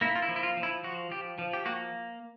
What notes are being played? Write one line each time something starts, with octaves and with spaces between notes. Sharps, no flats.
A#3 E4
F4
E4
F3
E4
F4
F3
E4
F3 F#4
F3 G4
F3
G4
A#3 F#4